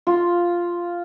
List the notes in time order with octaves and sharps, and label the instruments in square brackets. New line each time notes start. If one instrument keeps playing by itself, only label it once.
[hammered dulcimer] F4